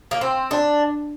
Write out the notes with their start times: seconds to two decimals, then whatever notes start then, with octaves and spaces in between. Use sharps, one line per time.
0.11 A#3
0.21 C4
0.51 D4